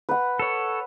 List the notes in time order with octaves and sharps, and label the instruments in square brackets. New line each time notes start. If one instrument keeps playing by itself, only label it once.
[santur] B4 F#5
[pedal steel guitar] A4 C#5